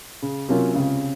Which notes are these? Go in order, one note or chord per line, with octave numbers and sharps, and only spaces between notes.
C#3
C3 F#3 A#3 C#4 F4
C#2 C#3